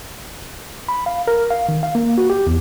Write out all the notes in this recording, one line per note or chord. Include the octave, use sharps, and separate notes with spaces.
B5
F5
A#4
F5
D#3
F5
A#3
F#4
G4
E2